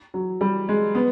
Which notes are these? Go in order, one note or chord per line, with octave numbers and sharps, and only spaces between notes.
F#3
G3
G#3
B3